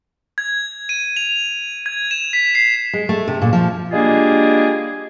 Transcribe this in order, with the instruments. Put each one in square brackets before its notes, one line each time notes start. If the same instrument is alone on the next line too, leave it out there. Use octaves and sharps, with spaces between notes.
[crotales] G#6
D#7
F7
G#6
E7
B6
C7
[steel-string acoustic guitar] G#3
A3
C3
A#2
F3
[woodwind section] G3 G#3 A#3 D4 F4 G#4